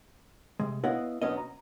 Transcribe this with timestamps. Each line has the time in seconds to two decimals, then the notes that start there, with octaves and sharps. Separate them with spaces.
0.60 C3 G#3
0.84 B3 E4 C#5 D#5 F5 F#5
1.22 B1 F#3 B3 C#4 D4 D#5
1.37 A#5